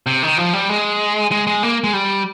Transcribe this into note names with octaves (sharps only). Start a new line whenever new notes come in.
C3
D#3
F3
G3
G#3
G#3
G#3
A#3
G#3
G3